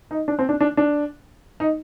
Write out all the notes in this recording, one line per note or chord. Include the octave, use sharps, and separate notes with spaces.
D#4
D4
C4
D4
D4
D4
D#4